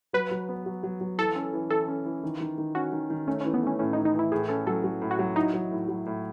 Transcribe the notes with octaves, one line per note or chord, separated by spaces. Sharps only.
F#3 B4
F#3
B3
F#3
F#3
F#3
E3 A4
C#4
E3
E3 A4
C#4
E3
D#3
D#3
D#3
C#4 F#4
D#3
D#3
A3 C#4
E3 C#4
B3
A3 C#4
A2 C#4
D#4
E3
D#4
E3 E4
A2 G#4
C#4 A4
F#3 A4
F#3
A2
F#4
F#3
D#4 E4
F#3
A2
F#3
A2